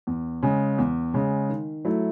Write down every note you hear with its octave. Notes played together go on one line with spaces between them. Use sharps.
E2
C#3 G#3
E2
C#3 G#3
D#3
F#3 A3 E4